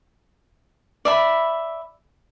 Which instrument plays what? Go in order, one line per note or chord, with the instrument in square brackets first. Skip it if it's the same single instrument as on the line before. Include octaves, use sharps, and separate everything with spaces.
[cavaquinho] D5 E5 B5